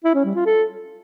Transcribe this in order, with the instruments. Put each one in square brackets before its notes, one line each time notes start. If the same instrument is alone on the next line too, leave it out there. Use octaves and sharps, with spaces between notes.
[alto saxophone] E4
C#4
G3
F4
A4